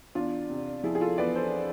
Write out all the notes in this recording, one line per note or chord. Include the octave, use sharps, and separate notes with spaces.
E2 D4 F4
C3
F3 E4 G#4
G#4
F4 A4
E2 B4 D5
A4 C5